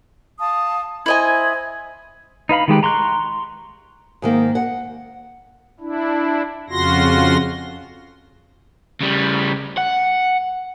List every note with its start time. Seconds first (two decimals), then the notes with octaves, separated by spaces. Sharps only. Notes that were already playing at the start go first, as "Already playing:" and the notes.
0.40 F5 A5 D#6
1.06 E4 C5 D#5 G#5 G#6
2.49 D#4 B4 F5 B5
2.68 D#3 G#3 G4 B4
2.83 A#5 C6 C#6 F#6
4.22 G#2 D#3 A#3
4.55 F#5
5.80 D4 E4
6.70 F2 C#3 F4 F#4 C6 A#6
9.01 C#3 G3
9.77 F#5